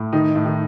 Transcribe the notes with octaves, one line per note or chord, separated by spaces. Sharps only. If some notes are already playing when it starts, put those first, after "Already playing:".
Already playing: A2
D#3 D#4
A2
D#3